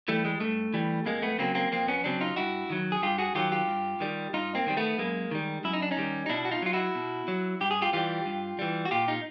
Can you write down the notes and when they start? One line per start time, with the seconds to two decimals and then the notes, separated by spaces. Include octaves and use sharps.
0.08 E3 G3 A3
0.25 G#3
0.40 G2 A3
0.74 E3 G3
1.06 F2 G#3 A#3
1.22 A3 B3
1.38 C#3 F#3 A#3 C4
1.55 A#3 C4
1.72 F2 A#3 C4
1.88 B3 C#4
2.04 C#3 F#3 C4 D4
2.21 D#4 F4
2.36 G2 E4 F#4
2.70 D#3 F#3
2.92 G#4
3.02 G2 F4 G4
3.18 F#4 G#4
3.35 D#3 F#3 F4 G4
3.52 F4 G4
3.68 G2
4.00 D#3 G3
4.33 G2 D#4 F4
4.55 A#3 C4
4.66 D#3 G3 C4
4.77 A3 B3
4.98 F#2 G#3 A#3
5.31 D#3 G3
5.64 F#2 E4
5.73 D#4
5.82 D4
5.91 C#4 D#4
5.97 D#3 G3
6.26 D#4
6.29 B2 D4 E4
6.45 F#4
6.51 D#4 F4
6.62 F#3 F4
6.73 E4 F#4
6.95 B2
7.28 F#3
7.61 G2 G4
7.71 G#4
7.82 F4 G4
7.93 E3 G3 F4 G4
8.26 G2
8.59 E3 G3
8.85 F#4
8.91 A#2 F4 G4
9.08 D#4 F4